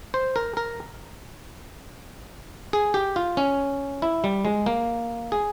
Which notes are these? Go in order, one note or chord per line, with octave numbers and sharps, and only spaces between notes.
C5
A#4
A#4
G#4
G4
F4
C#4
E4
G3
G#3
A#3
G#4